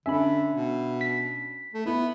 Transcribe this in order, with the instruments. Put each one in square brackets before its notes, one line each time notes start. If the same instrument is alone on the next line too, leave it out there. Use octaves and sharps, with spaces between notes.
[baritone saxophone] D3 [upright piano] C#4 D4 G#5 [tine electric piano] E5 B5
[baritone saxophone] B2
[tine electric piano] B6
[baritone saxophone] A3
[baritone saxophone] B3 [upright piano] E4